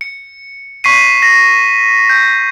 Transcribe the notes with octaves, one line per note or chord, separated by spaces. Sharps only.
C#7
C#6 B6 C7 D#7
A#6
G6